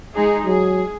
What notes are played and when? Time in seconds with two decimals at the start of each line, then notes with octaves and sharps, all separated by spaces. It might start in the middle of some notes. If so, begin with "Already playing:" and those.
0.14 G#3 D#4 G#4
0.45 F#3 G#4